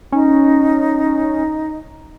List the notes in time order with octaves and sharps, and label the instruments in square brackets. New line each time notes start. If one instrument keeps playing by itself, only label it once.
[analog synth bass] C#4 [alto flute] D#4